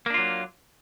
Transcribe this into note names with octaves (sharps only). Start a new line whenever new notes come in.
F#3 A#3 D4 F4